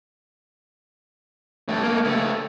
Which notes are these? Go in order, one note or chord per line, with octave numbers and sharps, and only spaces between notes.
G2 A3
A3 A#3
C#2 A3